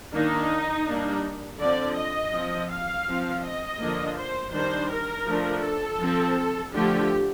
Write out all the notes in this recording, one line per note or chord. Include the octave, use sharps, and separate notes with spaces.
D#3 A#3 D4 D#4
G3 A#3 D4
D3 F3 C4 D5
D#5
F3 C4
F5
F3 C4
D#5
D3 F3 A#3 D4
C5
D#3 G3 D4 C5
A#4
F3 A3 D4
A4
F3 C4
D3 F3 A3 G4